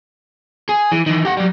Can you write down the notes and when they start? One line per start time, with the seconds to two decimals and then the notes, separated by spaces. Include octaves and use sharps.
0.69 G#4
0.92 E3
1.06 D#3 E3
1.25 G4 F#5
1.37 F#3 G3